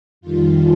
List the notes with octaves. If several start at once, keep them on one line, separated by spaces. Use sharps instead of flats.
F2 D#3 G3 F4